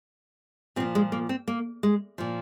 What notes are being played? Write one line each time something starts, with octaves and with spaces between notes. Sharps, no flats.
A#2 F3 C4
G#3
A#3
C4
A#3
G#3
A#2 F3